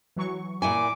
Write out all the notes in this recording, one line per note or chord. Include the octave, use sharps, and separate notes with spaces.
E3 F#3 C#6
A#2 E4 G#5 D6